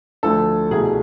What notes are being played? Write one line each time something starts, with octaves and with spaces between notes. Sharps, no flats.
D2 D3 F3 A3 A4
C2 B2 A3 G#4